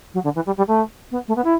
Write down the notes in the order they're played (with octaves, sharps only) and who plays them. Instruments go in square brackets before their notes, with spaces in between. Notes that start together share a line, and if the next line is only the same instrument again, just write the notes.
[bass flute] F#3
D3
E3
G3
G3
A3
B3
A3
B3
E4